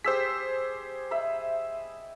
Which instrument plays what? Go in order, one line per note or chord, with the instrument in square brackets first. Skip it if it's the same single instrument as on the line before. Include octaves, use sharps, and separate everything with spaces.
[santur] G4 G#4 [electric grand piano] C5 E6 B6
[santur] D#5 E5 B5